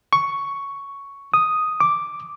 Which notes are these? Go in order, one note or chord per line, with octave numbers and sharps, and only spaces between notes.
C#6
D#6
D6